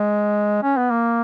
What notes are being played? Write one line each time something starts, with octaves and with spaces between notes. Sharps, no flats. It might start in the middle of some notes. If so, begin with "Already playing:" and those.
Already playing: G#3
C#4
B3
A#3